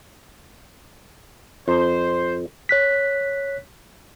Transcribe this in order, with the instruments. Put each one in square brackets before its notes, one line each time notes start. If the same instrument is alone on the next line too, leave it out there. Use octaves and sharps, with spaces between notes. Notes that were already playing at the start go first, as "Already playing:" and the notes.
[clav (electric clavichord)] F2 [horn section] C5
[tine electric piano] C#5 F#6 B6